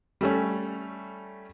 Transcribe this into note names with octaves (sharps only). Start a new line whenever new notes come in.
G3 A3 C#4